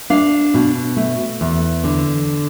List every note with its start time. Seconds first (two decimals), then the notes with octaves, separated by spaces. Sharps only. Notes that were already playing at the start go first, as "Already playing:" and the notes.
0.10 D4 F5
0.54 B2
0.97 A3
1.41 E2
1.84 D3